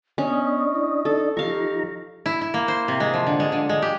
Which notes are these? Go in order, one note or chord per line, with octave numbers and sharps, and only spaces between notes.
B3 C#4 D4 D#5
E4
D#4 A4
F3 D#4 G4 F5 A#5 C#6
E4
E4
A#3
C5
C3
G#3
F3
D3
G#3
D3
G#3
G4